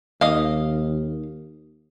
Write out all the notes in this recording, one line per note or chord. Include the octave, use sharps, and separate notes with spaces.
D#2 D#5 F5